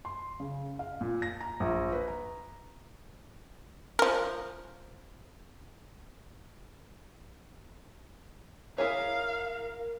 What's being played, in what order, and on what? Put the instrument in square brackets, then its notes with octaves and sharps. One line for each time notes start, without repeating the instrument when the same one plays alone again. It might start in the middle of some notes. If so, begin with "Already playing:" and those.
[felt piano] C6
C#3
F5
A#2
A#6
A#5
A#1
B4
A#5
[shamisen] F3 A#4
[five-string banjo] E4 G#4 C#5 [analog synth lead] A#4 [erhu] F5